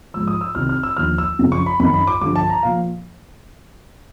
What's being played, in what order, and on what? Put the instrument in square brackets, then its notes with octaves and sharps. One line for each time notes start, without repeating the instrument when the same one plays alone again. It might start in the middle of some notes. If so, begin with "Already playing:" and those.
[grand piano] G#2 F3 E6
D#6
E6
C2 C3 D#3 F6
F6
E6
D#2 D3 F3 F6
E6
F#2 C#3 F3
C#6
B5
F#2 D#3 B5
B5
D6
G2 D3 F3 D6
A5
A#5
A#2 F3 F5